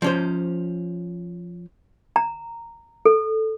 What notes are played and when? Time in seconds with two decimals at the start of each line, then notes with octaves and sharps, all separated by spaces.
0.02 F3 C#4 C5
2.16 A#5
3.05 A4